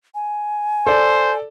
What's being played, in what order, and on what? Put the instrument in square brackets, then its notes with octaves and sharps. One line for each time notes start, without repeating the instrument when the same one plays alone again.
[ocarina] G#5
[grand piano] A4 D5 [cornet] C5